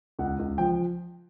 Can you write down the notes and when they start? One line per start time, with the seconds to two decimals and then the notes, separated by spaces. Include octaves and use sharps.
0.19 C#2 F#5
0.39 C#2
0.58 F3 G5